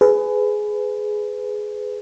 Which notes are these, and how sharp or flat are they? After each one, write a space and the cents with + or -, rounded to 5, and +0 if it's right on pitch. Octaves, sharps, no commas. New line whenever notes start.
G#4 +15 B4 +25